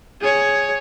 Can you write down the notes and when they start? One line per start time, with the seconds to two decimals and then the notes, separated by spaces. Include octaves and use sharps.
0.21 G#4 C#5